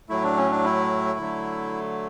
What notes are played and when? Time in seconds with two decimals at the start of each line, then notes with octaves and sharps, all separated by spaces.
0.09 A2 F#3 A3 E4
0.24 D4
0.37 C#4
0.51 D4
0.64 E4
1.19 D3 F#3 A3